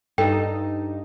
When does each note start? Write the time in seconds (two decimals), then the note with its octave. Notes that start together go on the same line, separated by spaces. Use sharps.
0.18 G2 D#4 A4 G5